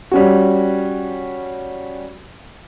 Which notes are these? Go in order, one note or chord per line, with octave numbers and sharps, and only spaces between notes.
G3 C#4 F#4